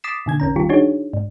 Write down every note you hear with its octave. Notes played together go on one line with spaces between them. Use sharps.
D6 D#6 A6 B6 C7 E7
A#2 D3 G#6
A1 E2 C#4 A#5
D#3 G3 F4 G4
D4 D#4 F#4 G#4 C#5
G#2